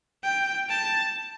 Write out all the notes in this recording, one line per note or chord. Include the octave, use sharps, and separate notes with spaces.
G5
A5